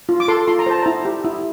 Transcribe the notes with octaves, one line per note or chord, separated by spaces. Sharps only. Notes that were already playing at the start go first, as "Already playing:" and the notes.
F4
D6
A4 C6
F4 C6
A#5
C5 A5
E4 A#5
G4
E4